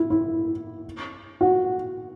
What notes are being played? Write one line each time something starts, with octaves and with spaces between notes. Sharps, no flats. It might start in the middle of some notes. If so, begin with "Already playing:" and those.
Already playing: E4
E4
F#4